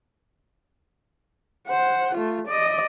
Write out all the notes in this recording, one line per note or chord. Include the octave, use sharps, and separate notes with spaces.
C5 F#5
A3 F4
D5 D#5